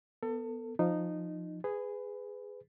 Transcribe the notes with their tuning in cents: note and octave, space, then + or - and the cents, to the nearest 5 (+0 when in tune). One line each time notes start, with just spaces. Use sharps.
B3 +0 A4 +30
F3 +0 D#4 -15
G#4 -5 B4 +20